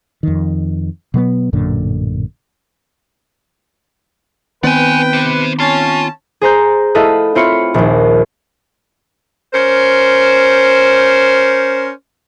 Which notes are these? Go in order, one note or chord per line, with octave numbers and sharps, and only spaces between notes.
F2 D#3
B2 F#3 A3 B3
A1 F#2 A#2 D3
D#3 B3 C4 B4 D5 G5 G#5
G4 C5
C#4 F4 A5
G#4 C5 A#5 G6
A3 E4 A4 B4 D#5 F5
C4 E4 F4 C#5 B5 C#7
A#1 D#2
C#4 A#4 C5